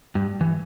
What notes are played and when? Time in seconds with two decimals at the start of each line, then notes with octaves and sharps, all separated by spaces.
0.15 G2
0.41 E3